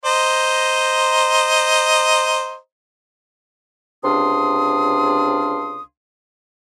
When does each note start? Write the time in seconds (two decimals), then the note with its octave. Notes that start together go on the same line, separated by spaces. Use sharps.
0.05 C5 D#5 A#5
4.04 C#2 C3 D4 F5 C6 D#6